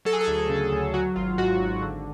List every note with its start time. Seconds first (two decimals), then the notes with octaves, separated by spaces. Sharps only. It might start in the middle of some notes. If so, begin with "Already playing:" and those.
0.05 F#3 A4
0.13 G#4
0.21 A4
0.27 D2
0.49 C#3
0.72 D2
0.94 F#3 F#4
1.16 G#1 F4
1.38 G#2 F#4
1.60 G#1
1.82 D3